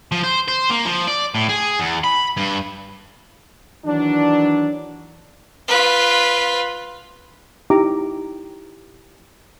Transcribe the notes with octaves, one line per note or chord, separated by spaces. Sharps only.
F3
C5
C5
A#3
F3
D5
A2
G#4
E2
B5
G2
D#3 E3 F#3 D4
F4 B4
D#4 E4 G4 E5 A#5 D6